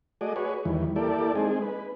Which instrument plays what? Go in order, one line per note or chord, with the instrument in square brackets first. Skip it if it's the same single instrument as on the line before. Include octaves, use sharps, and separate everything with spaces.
[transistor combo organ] A3 F#4 G#4 D5 D#5
F#4 G#4 B4 C#5
E2 D#3 E3 G3
A#3 E4 G4 A4 D5
G#3 C4 D#4 G#4
B4